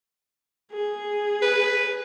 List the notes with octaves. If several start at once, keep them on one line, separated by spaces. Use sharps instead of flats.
G#4
B4